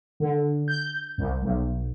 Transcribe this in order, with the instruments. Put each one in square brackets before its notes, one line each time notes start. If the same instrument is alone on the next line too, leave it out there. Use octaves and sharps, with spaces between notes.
[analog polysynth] D3
G6
C2
B1